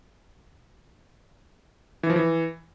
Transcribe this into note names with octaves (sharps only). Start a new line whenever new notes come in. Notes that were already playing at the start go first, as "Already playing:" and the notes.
E3
F3
E3